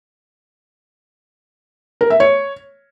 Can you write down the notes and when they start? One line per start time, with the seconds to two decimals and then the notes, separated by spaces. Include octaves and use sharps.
2.01 A#4
2.10 E5
2.20 C#5